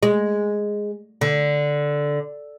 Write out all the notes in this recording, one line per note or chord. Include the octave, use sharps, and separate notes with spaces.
G#3
D3